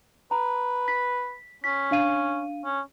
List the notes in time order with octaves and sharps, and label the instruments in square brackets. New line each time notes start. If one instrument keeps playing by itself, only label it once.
[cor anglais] B4 [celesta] A#5
[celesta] B6
[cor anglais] C#4 [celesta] B6
[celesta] D4 F5 D#7
[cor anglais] C#4